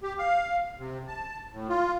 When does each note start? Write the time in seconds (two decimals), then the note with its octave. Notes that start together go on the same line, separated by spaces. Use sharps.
0.03 G4
0.18 F5
0.79 C3
1.08 A5
1.52 A2
1.69 F4